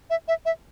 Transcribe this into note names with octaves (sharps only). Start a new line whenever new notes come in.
E5
E5
E5